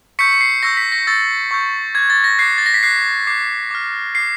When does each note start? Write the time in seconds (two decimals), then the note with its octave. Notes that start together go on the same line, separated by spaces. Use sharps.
0.19 C#6 E6 G6 B6 C#7
0.32 C#7
0.41 C7
0.63 C#6 E6 G6 A#6
0.77 B6
0.92 A#6
1.07 C#6 E6 G6 A6
1.51 C#6 E6 G6
1.95 D6 F#6 G#6
2.10 A6
2.24 A#6
2.39 D6 F#6 C7
2.58 A6
2.66 A#6
2.74 B6
2.83 D6 F#6 C7
3.27 D6 F#6 C7
3.71 D6 F6
4.15 D6 F6 C7